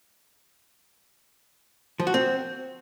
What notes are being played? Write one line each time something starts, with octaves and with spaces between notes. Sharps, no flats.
F3
F#4
C4